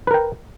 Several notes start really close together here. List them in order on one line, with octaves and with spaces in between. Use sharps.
B4 A#4 G5